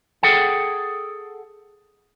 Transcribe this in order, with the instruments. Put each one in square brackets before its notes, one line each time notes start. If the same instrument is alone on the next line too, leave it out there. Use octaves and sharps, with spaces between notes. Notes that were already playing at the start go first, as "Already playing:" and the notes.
[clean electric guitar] G#4 A4 F#5 G5